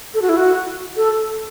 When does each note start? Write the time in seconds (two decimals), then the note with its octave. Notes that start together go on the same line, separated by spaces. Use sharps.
0.14 A4
0.22 F#4
0.29 E4
0.36 F#4
0.96 A4